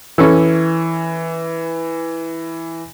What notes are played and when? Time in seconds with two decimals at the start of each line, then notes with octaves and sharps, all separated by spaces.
0.18 E3 C#4 A4 E6